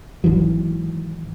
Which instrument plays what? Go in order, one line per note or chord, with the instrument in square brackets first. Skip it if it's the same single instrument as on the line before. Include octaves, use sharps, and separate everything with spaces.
[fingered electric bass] G#1 D#3 E3 F#3